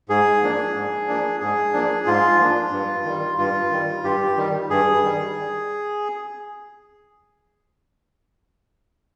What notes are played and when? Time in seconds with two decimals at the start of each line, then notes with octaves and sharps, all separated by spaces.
0.09 G#2 G#4
0.42 F3 A#3 D4
0.74 G#2
1.08 F3 A#3 D4
1.40 G#2 G#4
1.73 F3 A#3 D4
2.06 G#2 F4
2.39 F3 A#3 D4
2.72 G2
3.05 D#3 G3
3.38 G2 F4
3.71 D#3 G3
4.04 G2 G4
4.37 D#3 G3
4.70 G2 G#4
5.03 D#3 G3